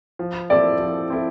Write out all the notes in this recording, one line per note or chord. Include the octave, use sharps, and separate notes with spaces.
F3
C4 E4 A4 D5
F3
C4 E4 A4